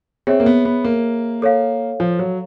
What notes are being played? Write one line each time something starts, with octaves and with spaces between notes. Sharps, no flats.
C4 G#4 C#5 E5
A#3
B3
B3
A#3
A4 C#5 F5
F3
F#3